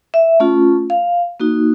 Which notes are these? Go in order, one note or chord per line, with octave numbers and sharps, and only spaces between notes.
E5
A3 C#4 F4
F5
A#3 D#4 F#4